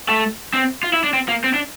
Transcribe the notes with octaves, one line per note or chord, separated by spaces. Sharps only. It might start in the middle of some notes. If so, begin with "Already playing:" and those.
A3
C4
F4
E4
D4
C4
A#3
C4
D4